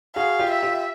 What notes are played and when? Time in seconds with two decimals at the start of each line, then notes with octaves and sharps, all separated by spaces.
0.16 F#4 G#4 F5
0.39 F4 G4
0.51 E5
0.63 F4 G4